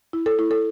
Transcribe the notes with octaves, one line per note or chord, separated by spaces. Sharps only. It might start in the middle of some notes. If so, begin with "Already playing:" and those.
E4
A4
E4
A4